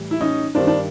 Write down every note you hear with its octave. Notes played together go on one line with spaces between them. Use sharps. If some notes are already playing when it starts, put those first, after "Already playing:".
Already playing: A2 E3 G3
E4
C#4 D#4
G2 D#3 G3 C4 D4
D4